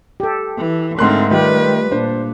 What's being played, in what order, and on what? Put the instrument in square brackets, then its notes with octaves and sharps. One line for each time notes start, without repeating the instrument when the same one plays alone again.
[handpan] G4 A4
[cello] E3
[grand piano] G#2 C6 F#6 [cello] D3 C4 [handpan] A3 A#4
[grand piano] D#3 [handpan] G3 F4 G4 [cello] A3 B4
[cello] A#2 [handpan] D4 [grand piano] C5